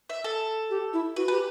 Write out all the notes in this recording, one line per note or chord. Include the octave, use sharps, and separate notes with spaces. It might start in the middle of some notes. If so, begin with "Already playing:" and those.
E5
A4
G4
E4
F#4 B4
G4 B4